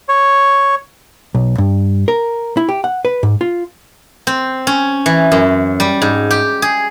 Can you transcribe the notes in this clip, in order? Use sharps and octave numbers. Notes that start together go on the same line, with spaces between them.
C#5
B1
G2
A#4
E4
G4
F#5
B4
G#2
F4
C4
C#4
E3
F#2
G3
G#2
G4
G#4